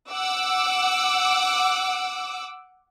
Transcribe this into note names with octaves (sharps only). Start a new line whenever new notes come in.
F#5 D6 E6